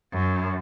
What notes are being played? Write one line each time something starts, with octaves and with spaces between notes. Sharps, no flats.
F#2